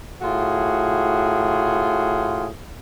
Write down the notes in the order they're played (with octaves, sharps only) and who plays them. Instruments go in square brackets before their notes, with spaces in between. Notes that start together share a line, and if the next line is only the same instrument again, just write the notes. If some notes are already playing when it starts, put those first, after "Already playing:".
[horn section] A2 F4 F#4 G#4